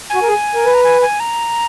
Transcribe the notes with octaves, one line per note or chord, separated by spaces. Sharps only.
F#4 G#5
A#4
G#4
A#4
B4
A#5
G#5
G#5
A#5